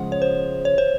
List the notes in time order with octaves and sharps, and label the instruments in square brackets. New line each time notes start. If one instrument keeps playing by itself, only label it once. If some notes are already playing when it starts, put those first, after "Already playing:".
Already playing: [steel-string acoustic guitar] C#3 F3 G#3 [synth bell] F#5
[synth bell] C#5
C5
C#5
C5